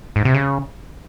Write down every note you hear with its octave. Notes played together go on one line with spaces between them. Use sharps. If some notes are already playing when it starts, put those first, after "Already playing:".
G#2
C3
C#3